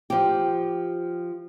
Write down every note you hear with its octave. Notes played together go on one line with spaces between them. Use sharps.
F3 G4